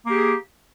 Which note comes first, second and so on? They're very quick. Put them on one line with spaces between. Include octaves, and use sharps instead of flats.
A#3 G4 G#4